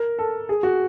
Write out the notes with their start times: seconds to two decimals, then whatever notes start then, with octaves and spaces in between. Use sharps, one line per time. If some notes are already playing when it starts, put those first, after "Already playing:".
Already playing: A#4
0.19 A4
0.49 G#4
0.63 F#4